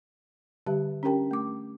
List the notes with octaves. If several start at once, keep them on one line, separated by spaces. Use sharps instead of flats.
D3 G3 G4 E5 A5
C#4 D4 G4 A#4 G5 A5
A3 D6